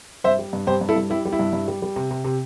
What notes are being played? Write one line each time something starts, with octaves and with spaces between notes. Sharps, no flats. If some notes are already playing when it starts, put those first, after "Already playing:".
G2 C5 E5
G3
G2
G2 G4 C5
G2
E4 A4
G2
G3 E4
G3
E4
G2
G2
G3
G3
C3
C3
C3